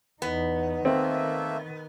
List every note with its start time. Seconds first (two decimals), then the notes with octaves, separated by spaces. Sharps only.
0.22 E2 B3 D#4
0.85 D#3 A3 A#3 C4 E5